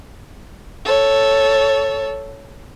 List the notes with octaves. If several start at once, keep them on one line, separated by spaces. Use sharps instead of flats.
A4 C#5